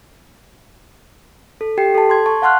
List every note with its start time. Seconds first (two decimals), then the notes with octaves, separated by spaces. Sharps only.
1.61 A4
1.78 G4 G5 C7
1.95 A4 A5
2.10 C6 G#6
2.26 A5 C#6
2.42 F5 F#5 A5 C6 F6 F#6